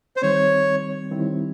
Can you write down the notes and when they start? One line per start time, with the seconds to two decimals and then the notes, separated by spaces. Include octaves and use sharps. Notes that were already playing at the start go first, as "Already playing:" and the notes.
0.16 C5
0.22 D#3 G3 C4 C#5
1.11 D#3 G3 C4 E4